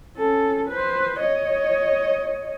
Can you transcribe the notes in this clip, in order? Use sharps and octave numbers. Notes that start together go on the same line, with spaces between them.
C#4 A4
B4 C5
C#5 D#5